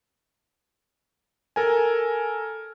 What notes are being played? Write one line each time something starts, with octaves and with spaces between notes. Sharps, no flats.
A4 A#4 G#5